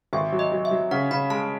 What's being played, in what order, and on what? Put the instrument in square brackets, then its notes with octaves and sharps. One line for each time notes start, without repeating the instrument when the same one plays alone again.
[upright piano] G#1 [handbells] E5
[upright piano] F#3
[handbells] D#5
[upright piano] F#3
[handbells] E5
[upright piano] F#3
[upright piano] C#3 [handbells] F#5
[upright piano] C#3 [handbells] B5
[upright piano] G#3 [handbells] A5